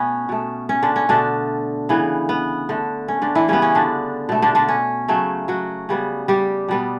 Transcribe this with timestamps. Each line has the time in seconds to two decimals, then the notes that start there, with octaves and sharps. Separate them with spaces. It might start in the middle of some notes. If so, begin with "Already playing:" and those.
Already playing: B2 A3 B3 C#4
0.29 B2 A3
0.69 C#4
0.83 D3 D4
0.96 C#4
1.09 B2 D3 A3 D4
1.89 C#3 E3 B3
2.29 B3
2.69 D3 A3
3.08 C#4
3.22 D3 D4
3.35 E3 E4
3.48 C#3 G3 B3 C#4
3.62 C#4
3.75 D3 D4
4.29 B2 A3
4.42 D3 D4
4.55 D3 D4
4.68 C#4
5.08 C#3 F#3 A3
5.48 F#3 F#4
5.89 C#3 G3 B3
6.28 G3 G4
6.69 B2 G3 B3